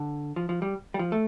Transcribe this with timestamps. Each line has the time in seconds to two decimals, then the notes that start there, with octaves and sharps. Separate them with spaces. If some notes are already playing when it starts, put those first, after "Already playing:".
Already playing: D3
0.36 F3
0.49 F3
0.62 G3
0.94 G3
0.99 F3
1.12 A3